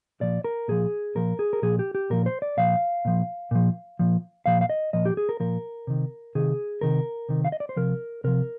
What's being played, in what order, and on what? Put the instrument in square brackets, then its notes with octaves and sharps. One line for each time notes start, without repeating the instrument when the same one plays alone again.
[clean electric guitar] A#2 F3 D5
A#4
A#2 F3 G#4
A#2 F3 A#4
G#4
A#4
A#2 F3 G#4
G4
G4
A#2 F3 A#4
C5
D5
A#2 F3 F5
A#2 F3
A#2 F3
A#2 F3
A#2 F3 F5
F5
D#5
A#2 F3 D#5
G4
G#4
A#4
A#2 F3 A#4
C3 D#3
C3 D#3 G#4
C3 D#3 A#4
C3 D#3
F5
D#5
D5
C5
C3 F3 A#4
C3 F3 A#4